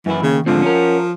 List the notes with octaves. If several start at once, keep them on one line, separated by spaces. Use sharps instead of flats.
F#2 E3 E4
D#2 C#3
G#2 D3 F3 C4
C#4 A#4